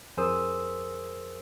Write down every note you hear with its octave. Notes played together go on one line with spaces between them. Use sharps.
F2 G#4 A#4 C5 D#6 E6